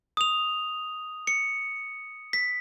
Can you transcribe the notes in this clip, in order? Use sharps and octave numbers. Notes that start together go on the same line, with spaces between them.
D#6 F7
C#7
B6